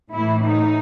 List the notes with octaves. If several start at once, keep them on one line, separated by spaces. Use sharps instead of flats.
A2 E3 E4
D#4